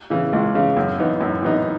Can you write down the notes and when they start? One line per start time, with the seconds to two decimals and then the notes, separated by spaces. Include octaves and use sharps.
0.10 C#3 E3
0.33 C#2
0.55 C#3 E3
0.77 F#2
0.98 E3 B3 D#4
1.21 F#2
1.42 E3 B3 D#4